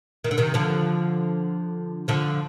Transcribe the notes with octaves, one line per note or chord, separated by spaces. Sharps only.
D#3
D3
C3 D#3
D3 F3
D3 F3